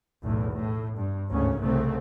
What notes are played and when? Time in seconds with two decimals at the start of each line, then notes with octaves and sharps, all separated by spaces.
0.23 B1 E2 A2
0.54 A2
0.97 G2
1.29 G#1 D2 G#2 C#3 C#4
1.61 C2 C#3 A3 C4